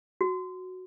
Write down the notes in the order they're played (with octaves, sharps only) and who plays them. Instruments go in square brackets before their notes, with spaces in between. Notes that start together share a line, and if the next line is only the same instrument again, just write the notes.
[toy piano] F#4